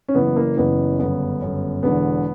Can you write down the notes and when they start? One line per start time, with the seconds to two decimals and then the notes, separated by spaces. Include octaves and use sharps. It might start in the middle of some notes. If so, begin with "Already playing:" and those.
0.08 C#4
0.15 F#1 F#2 E3 B3
0.36 A#3
0.57 F#1 F#2 E3 B3
0.99 G1 F#2 C#3 B3
1.42 G1 F#2 C#3
1.83 E1 E2 D3 B3